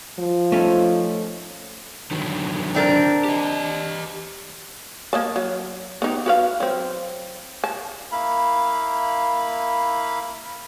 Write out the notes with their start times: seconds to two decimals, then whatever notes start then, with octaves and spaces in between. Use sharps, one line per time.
0.18 F3
0.52 A3 C#4 D#4
2.11 D3 D#3 F#3
2.75 C4 D4 A#4
3.25 G4 D#5
5.13 A#3 D#5 A5
5.36 F#3
6.02 B3 D#4 G4
6.26 F#4 B4 F5
6.60 F#3 C4
7.64 A5
8.12 A#3 E4 F5 B5